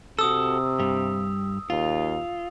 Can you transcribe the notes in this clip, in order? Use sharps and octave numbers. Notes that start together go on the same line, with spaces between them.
C3 F#4 A4 D#6 E6
G2 G3
D#2 F4